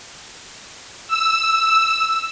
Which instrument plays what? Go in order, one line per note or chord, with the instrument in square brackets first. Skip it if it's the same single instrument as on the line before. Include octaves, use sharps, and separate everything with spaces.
[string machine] E6